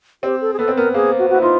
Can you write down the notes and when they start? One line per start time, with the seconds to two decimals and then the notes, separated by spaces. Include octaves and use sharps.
0.23 C4 G4
0.41 A4
0.53 G#4
0.59 B3 A4
0.68 C4
0.76 B3 A#4
0.94 A#3 G#4
1.19 F#4
1.30 E4 F#4
1.42 D#4 F4